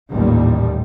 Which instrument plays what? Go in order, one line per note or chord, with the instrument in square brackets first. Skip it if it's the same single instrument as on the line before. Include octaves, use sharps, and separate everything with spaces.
[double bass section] A1 D#2 A#2 G3